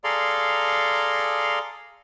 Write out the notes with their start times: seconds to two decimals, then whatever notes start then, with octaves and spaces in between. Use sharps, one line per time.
0.04 G#4 A4 D5 F5 A#5 C6